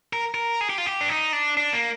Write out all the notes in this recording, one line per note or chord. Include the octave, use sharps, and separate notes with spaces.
A#4
A#4
G#4
G4
F4
G4
D4
D#4
D4
D4
A#3